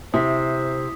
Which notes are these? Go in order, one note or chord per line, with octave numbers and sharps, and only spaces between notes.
C3 E4 C5 D#6 B6